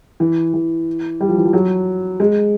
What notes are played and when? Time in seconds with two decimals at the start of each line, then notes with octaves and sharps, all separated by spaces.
0.20 E3
0.54 E3
1.20 G3
1.29 F3
1.37 E3
1.45 F3
1.53 F#3
2.20 G#3